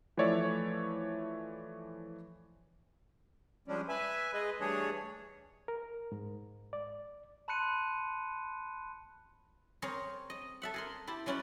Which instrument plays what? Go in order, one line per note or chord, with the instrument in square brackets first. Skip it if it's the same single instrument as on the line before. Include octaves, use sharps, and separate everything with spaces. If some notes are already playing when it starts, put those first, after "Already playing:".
[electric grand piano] E3 F3 A3 C#5 D5 E5
[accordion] F3 G3 G#3 C#4 D4
B4 E5 G#5
G#3 G#4 B4 D#5
E3 G3 A3 D4 G#4 C#5
[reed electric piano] A#4
G#2
D5
[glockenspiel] A5 B5 C6 F#6 C#7 D#7
[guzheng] C4 G#4 A#4 C#5
D#5
A4 E5 F#5
G#4 A#4 C6
E4 G4 A5 C6
F#3 G#3 C#4 B4 D5